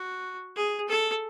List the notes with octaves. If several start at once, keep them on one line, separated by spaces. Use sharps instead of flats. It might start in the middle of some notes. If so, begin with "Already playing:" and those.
Already playing: F#4
G#4
A4